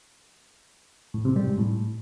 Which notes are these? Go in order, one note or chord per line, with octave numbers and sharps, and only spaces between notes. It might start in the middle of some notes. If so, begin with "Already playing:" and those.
A2
C3
G3
G#2
A2